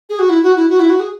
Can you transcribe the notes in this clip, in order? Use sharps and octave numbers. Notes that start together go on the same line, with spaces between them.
G#4
F#4
E4
F#4
E4
F#4
E4
F#4
G#4